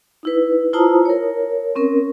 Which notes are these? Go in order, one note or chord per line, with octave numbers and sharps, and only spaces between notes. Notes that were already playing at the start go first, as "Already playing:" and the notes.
D#4 E4 B4
E4 F4 C5 A5 A#5 D#6
A#4 C#5
C4 C#4 A#4